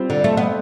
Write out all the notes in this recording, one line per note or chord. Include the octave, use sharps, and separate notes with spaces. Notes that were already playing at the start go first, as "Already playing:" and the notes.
Already playing: G3 C4 F4 C5
D3
A3
B3